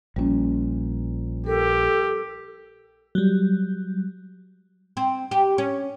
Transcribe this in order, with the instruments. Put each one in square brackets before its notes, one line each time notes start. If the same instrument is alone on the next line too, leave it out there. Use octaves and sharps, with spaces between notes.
[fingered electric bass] A#1 A#2 [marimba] G3 C#4
[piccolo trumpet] G4 [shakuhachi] A4 [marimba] A#4
[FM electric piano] F#3 G3
[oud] C4
G4
C#4